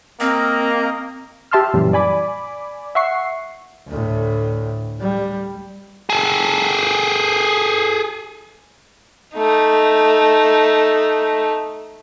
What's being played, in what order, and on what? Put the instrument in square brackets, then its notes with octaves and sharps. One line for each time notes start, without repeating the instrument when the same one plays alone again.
[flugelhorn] A#3 [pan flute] C4 [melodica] A#4 D#5 A#5
[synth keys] G4 E5 A5 C6 E6 F6
F#2 A#2 E3 G3
D5 G#5 B5 D6
E5 F#5 C#6 C7
[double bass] D2 A2
G3
[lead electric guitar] G#4 A4
[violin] A3 D#4